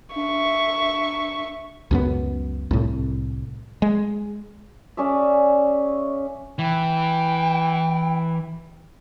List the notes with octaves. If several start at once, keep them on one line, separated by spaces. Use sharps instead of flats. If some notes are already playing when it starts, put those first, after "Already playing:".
D4 E5 C#6
C#2 F#2 B3
C2 A2
G#3
C#4 G#4 D5 E5
E3 G5